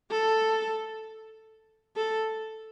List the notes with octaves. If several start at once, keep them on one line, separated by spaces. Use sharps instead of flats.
A4
A4